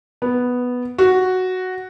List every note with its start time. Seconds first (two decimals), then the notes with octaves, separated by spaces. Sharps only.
0.22 B3
0.98 F#4